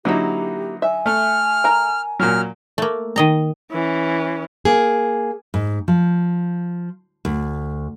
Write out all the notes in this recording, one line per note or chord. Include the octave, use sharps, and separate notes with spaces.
D3 F#3 A#3 D#4 E4 G4
E5 G#5
A3 F6
A#4 A#5
A#2 F#3 F6
A3 A#3
D#3 D#5 A#5
E3 C#4
A#3 G#4
G#2
F3
D2